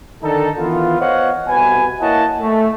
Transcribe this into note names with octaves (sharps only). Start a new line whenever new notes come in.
D3 D#3 D4 D#4 A4
D#3 E3 B3 F4
B3 C5 C#5 D#5 F5 F#5
C2 B2 B4 G#5
A#3 E4 C#5 D#5 F#5 A5
A3